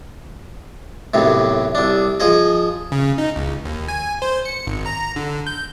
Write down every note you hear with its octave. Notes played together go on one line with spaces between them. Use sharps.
B1 F#2 A2 C3
C2 D4
F3 G#4 D#5
C#3
D#4
C#2
D#2
G#5
C5
C#7
G#1
A#5
D3
G6